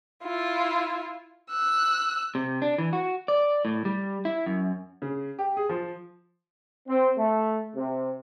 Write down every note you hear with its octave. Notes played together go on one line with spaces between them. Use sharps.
E4 F4
E6 F#6
C3
D4
E3
F#4
D5
A2
G3
E4
F#2
C#3
G4
G#4
F3
C4
A3
C3